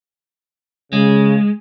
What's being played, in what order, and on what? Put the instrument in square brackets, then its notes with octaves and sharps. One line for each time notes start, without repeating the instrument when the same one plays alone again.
[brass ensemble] C#3 [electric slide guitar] G#3